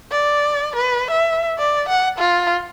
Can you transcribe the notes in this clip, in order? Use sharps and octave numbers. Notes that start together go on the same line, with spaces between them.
D5
B4
E5
D5
F#5
F4